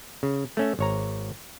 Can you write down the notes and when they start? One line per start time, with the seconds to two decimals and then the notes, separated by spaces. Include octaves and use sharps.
0.23 C#3
0.57 A3 C#4 E5
0.79 G#1 C#5 A#5